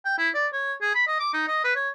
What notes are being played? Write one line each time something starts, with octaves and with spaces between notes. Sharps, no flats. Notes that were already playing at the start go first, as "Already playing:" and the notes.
G5
E4
D5
C#5
G#4
B5
D#5
D6
D#4
D#5
B4
C#5